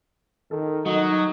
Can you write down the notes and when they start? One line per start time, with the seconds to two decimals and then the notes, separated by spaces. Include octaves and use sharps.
0.51 D#3 A4
0.86 F#3 D#4 F#4 D#5